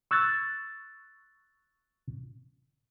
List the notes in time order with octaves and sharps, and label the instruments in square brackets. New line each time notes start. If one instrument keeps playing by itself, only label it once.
[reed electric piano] C#6 E6 F#6 G#6 A6